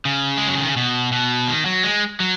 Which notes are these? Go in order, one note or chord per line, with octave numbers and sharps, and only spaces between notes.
C#3
G#3
F#3
D#3
C#3
B2
B2
D#3
F#3
G#3
F#3